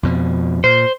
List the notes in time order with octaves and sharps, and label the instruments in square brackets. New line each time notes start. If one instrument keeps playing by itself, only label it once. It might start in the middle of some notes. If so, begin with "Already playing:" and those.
[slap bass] F2 B2 F3
[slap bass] A#2 [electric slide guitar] C5